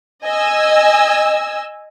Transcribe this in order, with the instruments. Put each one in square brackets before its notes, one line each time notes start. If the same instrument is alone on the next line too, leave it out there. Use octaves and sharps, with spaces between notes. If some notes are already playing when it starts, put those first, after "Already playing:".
[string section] D#5 G#5 E6